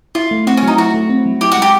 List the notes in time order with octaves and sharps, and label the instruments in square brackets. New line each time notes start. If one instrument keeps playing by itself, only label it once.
[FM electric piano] E4 [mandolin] F4
[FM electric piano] A3
[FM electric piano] C4 [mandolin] F#4
[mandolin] C#4
[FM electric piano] F#3 [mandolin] D#4
[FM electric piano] E4 [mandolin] F#4
[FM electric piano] A3
C4
F#3
[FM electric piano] E4 [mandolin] G4
[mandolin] F#4
[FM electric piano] G#3 [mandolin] G4